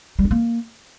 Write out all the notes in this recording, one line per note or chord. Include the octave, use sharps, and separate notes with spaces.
G3
D4
A#3